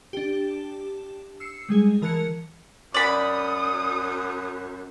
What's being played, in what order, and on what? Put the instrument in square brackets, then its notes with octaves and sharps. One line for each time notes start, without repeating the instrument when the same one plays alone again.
[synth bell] D4 G4
E6 C7 C#7
G3 G#3 G#4
E3 A#4 A5 F#6 G#6 C#7
[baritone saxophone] F#2 [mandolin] D5 B5 [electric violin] D#6